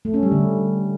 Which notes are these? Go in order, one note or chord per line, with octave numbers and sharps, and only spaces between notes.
A3
C#4
G3
D3